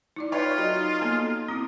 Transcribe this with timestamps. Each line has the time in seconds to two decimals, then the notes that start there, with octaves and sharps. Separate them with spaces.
0.16 D#4 E4 D5
0.32 F4 B4 C#5 D5 E5 G5
0.58 F#3 D#4
1.01 A#3 B3 A4
1.48 C4 E4 D#6